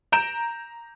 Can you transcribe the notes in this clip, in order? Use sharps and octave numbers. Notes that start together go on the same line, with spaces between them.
A#5 G6 D7 E7